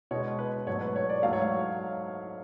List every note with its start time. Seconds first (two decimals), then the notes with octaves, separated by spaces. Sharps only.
0.11 B2 C#5
0.15 G#3
0.39 B4
0.67 G#2 F#3 A3 C#5
0.81 B4
0.96 C#5
1.09 D5
1.23 G#2 F#3 A3 F5
1.33 C#5
1.42 F5